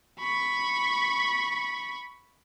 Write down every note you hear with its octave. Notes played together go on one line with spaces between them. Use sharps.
B5 C#6